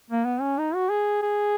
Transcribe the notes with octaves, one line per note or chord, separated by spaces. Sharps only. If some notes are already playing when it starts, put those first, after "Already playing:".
A#3
B3
C#4
D#4
F#4
G#4
G#4